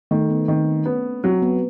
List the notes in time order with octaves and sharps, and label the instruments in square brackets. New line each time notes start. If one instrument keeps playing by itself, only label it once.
[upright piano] D#3 [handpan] A3
[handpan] B3
[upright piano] D#3 [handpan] C4
[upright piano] B3 [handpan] C#4
[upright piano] F#3 [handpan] C4
[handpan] B3